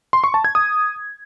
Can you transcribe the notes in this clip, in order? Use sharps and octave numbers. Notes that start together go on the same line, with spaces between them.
C6
C#6
A5
G#6
D#6